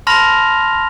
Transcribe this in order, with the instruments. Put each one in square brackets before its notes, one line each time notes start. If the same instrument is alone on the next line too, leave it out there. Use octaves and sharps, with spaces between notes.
[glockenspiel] A5 B5 C6 F6 A#6 F7